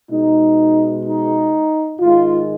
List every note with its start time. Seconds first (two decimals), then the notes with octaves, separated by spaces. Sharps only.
0.10 B2 G#3 D#4
1.05 D#4
2.00 G#2 D#3 G#3 F4